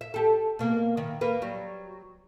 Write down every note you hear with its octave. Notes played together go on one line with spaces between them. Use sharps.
E5
G4 A4
B2 A#3 A#4
D#3 E3
A#3 B4
F#3 G3